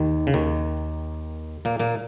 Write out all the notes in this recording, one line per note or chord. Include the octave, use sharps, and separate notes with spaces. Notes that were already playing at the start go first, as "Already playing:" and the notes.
Already playing: D#2 D#3
C#3
D#2 D#3
A#2 A#3
A#2 A#3